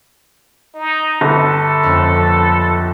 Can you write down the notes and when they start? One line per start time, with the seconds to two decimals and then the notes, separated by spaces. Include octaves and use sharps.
0.75 D#4
1.21 G1 A4
1.83 F2 A#3 C#4